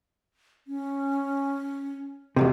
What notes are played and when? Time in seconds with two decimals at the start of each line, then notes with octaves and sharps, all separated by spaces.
0.67 C#4
2.36 E2 G#2 C3